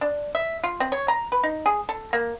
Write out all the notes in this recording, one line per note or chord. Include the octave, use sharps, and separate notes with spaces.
D4
E5
F4
C4
C#5
A#5
B4
D#4
G#4
A4
A#3